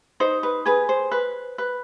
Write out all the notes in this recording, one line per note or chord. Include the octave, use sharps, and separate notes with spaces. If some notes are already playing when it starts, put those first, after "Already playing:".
D#4 C5
B4
G#4 B4
C5
B4
B4